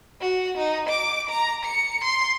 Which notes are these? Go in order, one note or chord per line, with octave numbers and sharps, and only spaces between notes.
F#4
D#4
D6
A#5
C#7
C6